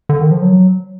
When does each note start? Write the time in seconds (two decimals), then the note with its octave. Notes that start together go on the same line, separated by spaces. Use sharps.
0.09 D3
0.20 D#3
0.31 F3
0.42 F#3